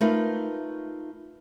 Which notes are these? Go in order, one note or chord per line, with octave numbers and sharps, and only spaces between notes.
A3 D#4 F4 A#4 B4